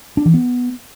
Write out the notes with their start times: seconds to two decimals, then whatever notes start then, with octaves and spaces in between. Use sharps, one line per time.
0.17 D4
0.26 E3
0.34 B3